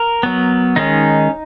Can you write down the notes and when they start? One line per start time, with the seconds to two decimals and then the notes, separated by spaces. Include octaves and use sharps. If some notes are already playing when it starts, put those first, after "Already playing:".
Already playing: A#4
0.23 F#3 B3
0.76 D#3 G#3 C#4 D#4